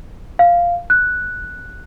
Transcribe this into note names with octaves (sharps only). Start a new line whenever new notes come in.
F5
F#6